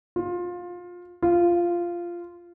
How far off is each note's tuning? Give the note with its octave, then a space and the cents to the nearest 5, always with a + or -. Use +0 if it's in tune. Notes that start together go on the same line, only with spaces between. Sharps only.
F4 +20
F4 -10